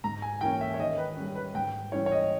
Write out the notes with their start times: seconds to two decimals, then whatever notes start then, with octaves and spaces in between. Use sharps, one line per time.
0.04 G#2 A#5
0.22 G#5
0.41 E3 A#3 C#4 G5
0.61 E5
0.74 C#5
0.79 D#3 D#5
0.98 B4
1.16 G3 C#4
1.35 B4
1.55 G#2 G5
1.92 E3 G3 C#4 E4 C#5
2.06 C#5
2.12 D#5